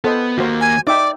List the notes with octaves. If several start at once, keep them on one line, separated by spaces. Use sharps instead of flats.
B3 A4 C5 D#5
D#2 A#3 F#4 C5
G#5
D#4 D5 E5 G5 D6